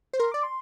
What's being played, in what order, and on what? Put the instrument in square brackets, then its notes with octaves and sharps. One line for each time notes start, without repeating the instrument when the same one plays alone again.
[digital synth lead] C5
[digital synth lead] A#4 [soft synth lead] C6
[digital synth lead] D5 [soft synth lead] D6
[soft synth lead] C6